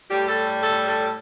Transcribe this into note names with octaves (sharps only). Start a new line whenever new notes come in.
A2 G3 G4
A4
A4
A4